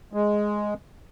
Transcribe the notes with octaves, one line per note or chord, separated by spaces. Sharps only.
G#3